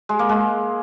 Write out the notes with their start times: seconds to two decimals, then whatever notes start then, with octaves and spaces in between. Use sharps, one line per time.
0.09 G#3
0.19 A#3
0.29 G#3